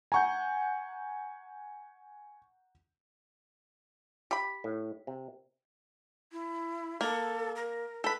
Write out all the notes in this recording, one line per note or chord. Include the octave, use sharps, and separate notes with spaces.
F#5 G#5 A#5 C#6 G6
G4 B5
A2
C3
E4
A#3 A4
A#4
A4 B4 B5